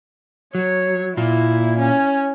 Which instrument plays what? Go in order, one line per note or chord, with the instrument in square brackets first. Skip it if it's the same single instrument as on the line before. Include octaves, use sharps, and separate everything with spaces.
[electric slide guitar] F#3 [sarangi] C#5
[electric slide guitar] A#2 F4 [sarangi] E4
[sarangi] C#4